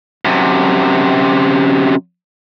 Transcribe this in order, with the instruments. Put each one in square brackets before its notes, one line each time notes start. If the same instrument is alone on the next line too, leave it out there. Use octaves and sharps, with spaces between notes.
[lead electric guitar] F#2 C3